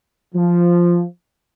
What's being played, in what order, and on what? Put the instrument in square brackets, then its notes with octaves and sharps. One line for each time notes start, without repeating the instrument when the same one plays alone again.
[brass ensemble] F3